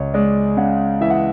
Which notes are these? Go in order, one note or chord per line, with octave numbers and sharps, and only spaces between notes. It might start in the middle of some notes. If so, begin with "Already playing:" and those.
Already playing: C#2 C#5
G#3 D5
C#3 F#5
E3 E5
F#5